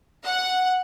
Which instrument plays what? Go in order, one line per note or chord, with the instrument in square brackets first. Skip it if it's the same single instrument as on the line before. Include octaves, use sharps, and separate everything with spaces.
[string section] F#5